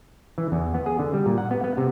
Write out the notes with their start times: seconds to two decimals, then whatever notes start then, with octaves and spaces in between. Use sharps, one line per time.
0.38 E3
0.52 E2
0.74 B3
0.86 G#4
0.99 D3
1.14 G3
1.26 A#2
1.38 F#5
1.51 B3
1.64 B3
1.77 C3